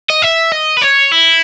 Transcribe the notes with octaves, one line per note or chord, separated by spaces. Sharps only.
D#5
E5
D#5
B4
C#5
E4